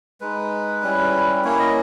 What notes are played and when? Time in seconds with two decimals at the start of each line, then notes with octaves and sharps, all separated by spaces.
0.21 G#3 D#4 B4
0.83 G3 C#4 E4
1.44 A#3 C#4 E4 C#5
1.59 D#5